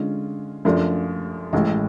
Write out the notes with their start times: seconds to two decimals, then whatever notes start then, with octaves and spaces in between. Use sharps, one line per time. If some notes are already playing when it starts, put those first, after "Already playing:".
Already playing: D3 G#3 C#4 F4
0.65 F#2 F3 A3 D4
1.53 A1 A2 G#3